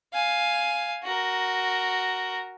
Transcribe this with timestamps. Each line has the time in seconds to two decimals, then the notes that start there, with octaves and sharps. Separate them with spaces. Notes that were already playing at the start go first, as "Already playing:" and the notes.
0.13 F5 G#5
1.04 F#4 A#4